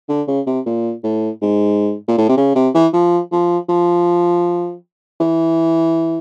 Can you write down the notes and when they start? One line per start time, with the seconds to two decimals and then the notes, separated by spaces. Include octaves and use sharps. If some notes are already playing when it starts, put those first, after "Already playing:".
0.09 D3
0.27 C#3
0.47 C3
0.66 A#2
1.04 A2
1.42 G#2
2.08 A#2
2.18 A2
2.29 C3
2.37 C#3
2.55 C3
2.74 E3
2.93 F3
3.32 F3
3.69 F3
5.20 E3